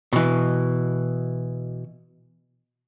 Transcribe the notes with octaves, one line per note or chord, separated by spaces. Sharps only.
B2 E3